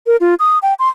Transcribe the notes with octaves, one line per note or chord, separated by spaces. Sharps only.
A#4
F4
D#6
G5
C6